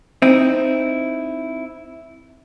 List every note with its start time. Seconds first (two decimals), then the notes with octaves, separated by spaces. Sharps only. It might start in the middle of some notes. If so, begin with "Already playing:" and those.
0.22 C4 D#4 E4